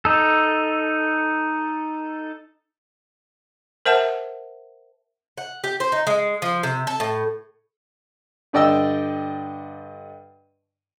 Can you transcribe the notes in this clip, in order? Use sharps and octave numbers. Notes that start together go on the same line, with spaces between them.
D#4 A4
A#4 C5 E5 F#5 A5
F#5
G4
C5
D#4
G#3
F3
C3
A4
A2
G2 D3 D5 D#5 G5 E6